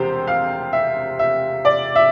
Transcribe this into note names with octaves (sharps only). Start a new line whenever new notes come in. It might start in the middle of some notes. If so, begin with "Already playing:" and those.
Already playing: E1 C3 G4 C5
F5
E5
E5
D5
E5